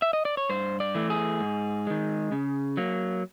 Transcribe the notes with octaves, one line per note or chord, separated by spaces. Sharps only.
E5
D#5
D5
C#5
G2 C5
D5
E3 A3
G#4
G#2
D#3 G#3
C#3
F#3 A#3